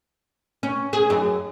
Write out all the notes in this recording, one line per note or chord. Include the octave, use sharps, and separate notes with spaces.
C#4
G#4
F#2